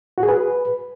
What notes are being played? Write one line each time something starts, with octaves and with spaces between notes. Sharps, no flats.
F#4
G#4
B4